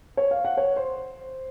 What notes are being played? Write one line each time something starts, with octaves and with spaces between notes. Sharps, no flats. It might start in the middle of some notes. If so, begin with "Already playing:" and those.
C#5
F5
F#5
C#5
C5